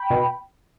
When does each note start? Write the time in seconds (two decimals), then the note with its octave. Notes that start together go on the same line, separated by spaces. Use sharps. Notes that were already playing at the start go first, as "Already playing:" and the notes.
Already playing: G5 B5
0.10 B2